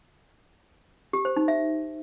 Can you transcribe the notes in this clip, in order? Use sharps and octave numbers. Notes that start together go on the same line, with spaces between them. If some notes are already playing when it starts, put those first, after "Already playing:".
G4
C5
D#4
E5